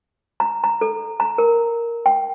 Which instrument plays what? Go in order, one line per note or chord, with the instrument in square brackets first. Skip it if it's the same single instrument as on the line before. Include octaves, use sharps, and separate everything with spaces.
[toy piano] A#5
A#5
A4
A#5
A#4
G5